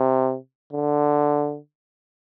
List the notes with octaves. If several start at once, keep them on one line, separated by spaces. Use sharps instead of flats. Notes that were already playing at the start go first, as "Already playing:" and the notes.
Already playing: C3
D3